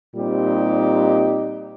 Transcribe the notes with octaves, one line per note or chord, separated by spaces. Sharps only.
A#2 G3 C4 D#4 G4